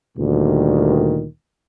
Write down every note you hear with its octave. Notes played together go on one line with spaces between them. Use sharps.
D2 A#2 D#3 G3